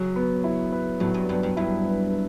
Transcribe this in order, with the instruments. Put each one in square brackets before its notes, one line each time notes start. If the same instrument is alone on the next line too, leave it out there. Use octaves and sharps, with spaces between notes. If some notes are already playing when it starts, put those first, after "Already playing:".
Already playing: [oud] C#3 [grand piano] F#3
[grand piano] B3
E4
B4
[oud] A2 [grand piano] F#3
[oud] G2
[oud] G2 [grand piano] B3
[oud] G2
[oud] G2 [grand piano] E4
[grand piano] B4